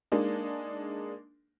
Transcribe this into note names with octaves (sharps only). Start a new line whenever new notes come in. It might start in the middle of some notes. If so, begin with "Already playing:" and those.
G#3 A#3 D4 D#4